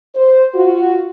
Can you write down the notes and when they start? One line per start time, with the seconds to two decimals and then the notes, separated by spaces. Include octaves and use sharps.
0.15 C5
0.55 F4 F#4